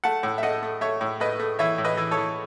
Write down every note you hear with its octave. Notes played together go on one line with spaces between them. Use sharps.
A3 F#5 A5
A2
E5
A3 D#5 F#5
A3
A3 C#5 E5
A2
A3 B4 D#5
A3
E3 C#5 E5
A2
B4 D#5
E3
A4 C#5
E3